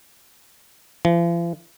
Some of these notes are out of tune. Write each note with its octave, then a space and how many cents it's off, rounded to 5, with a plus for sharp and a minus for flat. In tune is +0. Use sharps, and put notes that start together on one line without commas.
F3 -45